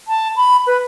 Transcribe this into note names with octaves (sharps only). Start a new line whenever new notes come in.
A5
B5
B4